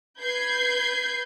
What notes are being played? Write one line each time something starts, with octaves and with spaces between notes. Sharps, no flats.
B4 G6 G#6 C7